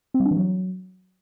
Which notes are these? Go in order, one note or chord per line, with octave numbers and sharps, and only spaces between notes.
C4
G3
D4
E3
F#3